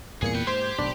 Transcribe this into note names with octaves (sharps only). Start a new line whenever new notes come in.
E2 G2 A#2 G3 C4 G#4 C#7
B4 G5
G#2 A#3 G4 C5 G#6
D1 B1 D4 B5